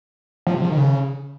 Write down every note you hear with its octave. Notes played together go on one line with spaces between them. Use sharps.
F3
C3
F3
D#3
C#3